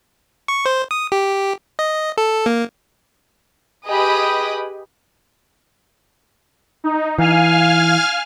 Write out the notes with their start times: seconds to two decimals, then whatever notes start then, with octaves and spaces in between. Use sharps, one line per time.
0.48 C#6
0.66 C5
0.91 D#6
1.12 G4
1.79 D#5
2.18 A4
2.46 A#3
3.88 G4 G#4 B4 D#5 B5 D#6
6.84 D#4
7.19 E3 F5 G#5 F6